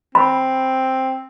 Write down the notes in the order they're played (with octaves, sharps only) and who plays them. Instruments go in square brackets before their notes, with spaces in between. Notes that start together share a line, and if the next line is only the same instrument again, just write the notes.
[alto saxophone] C4 [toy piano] B5